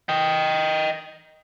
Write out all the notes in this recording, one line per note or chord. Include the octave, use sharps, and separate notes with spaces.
D#5 G5